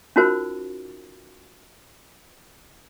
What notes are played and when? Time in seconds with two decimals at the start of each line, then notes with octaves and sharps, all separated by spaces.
0.16 C#4 D#4 F4 F#4 A#4 C5